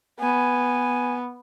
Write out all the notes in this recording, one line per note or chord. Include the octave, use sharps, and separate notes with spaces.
B3 G#5